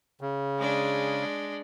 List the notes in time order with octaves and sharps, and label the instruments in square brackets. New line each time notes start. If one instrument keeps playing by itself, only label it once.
[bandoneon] C#3
[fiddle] G#3 D4